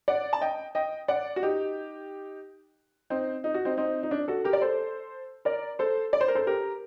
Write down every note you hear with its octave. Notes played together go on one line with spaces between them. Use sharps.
D5 F#5
A5
D#5 G5
D#5 G5
D5 F#5
F#4
D#4 G4
C4 D#4
D#4
F#4
C4 D#4
C4 D#4
D#4
D4
F#4 A4
G4 A#4
D5
A4 C5
A#4 D5
A4 C5
D5
C5
A#4
A4 C5
G4 A#4